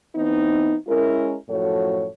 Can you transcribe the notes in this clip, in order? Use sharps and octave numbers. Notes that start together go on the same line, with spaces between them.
E3 B3 C4 D#4
G#3 C#4 E4 A#4
F#2 A2 F3 F#4 A4 C#5